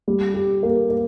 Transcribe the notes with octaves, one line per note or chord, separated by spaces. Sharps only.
G3
G4
A#3
A#3